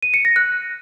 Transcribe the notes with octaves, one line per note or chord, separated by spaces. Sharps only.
D#7
C#7
A#6
F#6